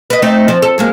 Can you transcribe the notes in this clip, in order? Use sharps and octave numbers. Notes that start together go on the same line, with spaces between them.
B4 D#5
A3 C4 D#4
F3 C4
A4
F#2 G#3 A#3